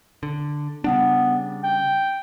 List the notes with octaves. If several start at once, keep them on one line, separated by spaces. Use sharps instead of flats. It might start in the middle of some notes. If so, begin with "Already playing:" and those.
D3
C#3 G3 B3 D4
G5